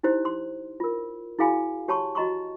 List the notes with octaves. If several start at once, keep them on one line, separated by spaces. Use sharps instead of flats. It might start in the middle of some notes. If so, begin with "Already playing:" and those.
D#4 E4 G4 C5
C6
F4 A#4
E4 F#4 G#4 F5 G#5 B5
G4 C#5 A5 B5 C#6
F#4 D#5 A#5 C6 C#6